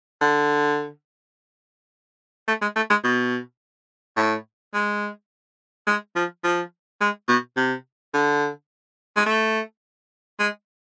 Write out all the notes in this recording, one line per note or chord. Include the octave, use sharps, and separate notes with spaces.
D3
A3
G#3
A3
G#3
B2
A2
G#3
G#3
F3
F3
G#3
B2
C3
D3
G#3
A3
G#3